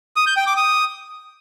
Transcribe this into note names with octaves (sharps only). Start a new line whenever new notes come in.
D#6
G6
G5
D6
D#6